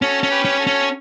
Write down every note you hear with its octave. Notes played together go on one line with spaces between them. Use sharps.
C#4 F#4 A4
C#4
G4 B4
C#4
F#4 A4
C#4